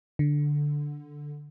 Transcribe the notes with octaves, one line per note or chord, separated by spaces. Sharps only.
D3